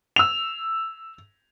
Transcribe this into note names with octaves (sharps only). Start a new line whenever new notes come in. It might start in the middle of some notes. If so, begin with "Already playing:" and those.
E6 F7